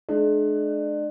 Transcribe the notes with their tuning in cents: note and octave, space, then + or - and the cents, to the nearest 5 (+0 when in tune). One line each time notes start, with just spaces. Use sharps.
G#3 +45 D4 +35